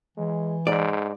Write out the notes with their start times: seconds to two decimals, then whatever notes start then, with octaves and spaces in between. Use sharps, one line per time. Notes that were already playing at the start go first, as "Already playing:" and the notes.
0.17 E3 G#3
0.67 G#2 D5